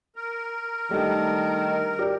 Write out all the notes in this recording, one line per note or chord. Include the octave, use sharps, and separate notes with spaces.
A#4
D#3 G3 A3 D4
G4 D5